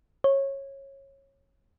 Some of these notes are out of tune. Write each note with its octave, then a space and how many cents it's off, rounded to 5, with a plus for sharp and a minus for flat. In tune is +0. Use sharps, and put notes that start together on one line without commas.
C#5 -20